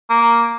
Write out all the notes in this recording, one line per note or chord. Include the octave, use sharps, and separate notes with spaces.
A#3